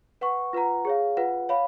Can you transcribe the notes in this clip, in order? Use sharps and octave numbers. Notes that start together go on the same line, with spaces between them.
B4 F#5 C#6
F4 B4 F#5 A#5
G#4 C#5 F5
F4 B4 F#5
C#5 F5 B5